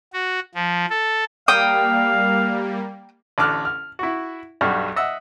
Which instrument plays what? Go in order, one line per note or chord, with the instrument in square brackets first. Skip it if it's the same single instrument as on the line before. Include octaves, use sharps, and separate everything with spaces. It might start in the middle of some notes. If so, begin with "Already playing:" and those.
[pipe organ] F#4
F3
A4
[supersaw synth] G3 A#3 [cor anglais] F5 [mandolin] G5 D#6
[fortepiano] A1 D3 A5 D6 F6 F#6
F6
E4 F#4
B1 G2 G3 F#4 F6
D#5 E5 F#5 E6